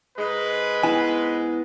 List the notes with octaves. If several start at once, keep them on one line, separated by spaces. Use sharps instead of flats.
G#2 G#3 B4
B3 E4 G#5